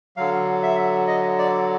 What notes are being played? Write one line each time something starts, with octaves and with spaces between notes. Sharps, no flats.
D3 F#3 F5
E5
D#5
D5